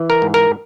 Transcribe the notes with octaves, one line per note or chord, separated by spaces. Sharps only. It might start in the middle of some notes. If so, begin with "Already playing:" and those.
Already playing: E3
A#4
G#2
A#4